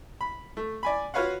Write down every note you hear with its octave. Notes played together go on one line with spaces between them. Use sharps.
B5
A3
D5 G#5 B5
F4 F#4 B4 C#5 F5 F#5